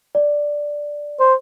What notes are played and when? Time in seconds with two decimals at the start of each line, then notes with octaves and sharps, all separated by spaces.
0.15 D5
1.20 C5